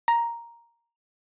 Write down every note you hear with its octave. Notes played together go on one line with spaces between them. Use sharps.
A#5